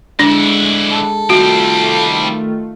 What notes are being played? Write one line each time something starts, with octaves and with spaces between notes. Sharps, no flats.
D3 G#3 D4 E4
A4
D#3 G3 A3 C4 F4 F#4